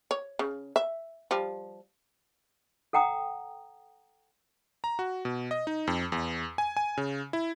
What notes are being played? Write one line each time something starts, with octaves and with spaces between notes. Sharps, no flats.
C#5
C#3
E5
F3 G3
A4 F#5 G5 A#5 D#6
A#5
F#4
B2
D#5
D#4
F2
E2
G#5
G#5
C#3
E4